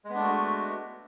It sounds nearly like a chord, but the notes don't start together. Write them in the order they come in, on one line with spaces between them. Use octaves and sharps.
G#3 B3 D4 A3 F#4